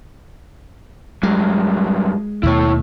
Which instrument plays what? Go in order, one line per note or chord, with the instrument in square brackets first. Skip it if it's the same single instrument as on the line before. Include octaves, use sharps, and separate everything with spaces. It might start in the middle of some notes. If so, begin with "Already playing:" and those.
[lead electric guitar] G2 F#3 [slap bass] G#3
[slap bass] D#2 B2 A3 [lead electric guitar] E4 C#5